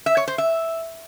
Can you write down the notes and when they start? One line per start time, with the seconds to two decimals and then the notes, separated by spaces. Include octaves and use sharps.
0.06 E5
0.17 C#5
0.28 C5
0.38 E5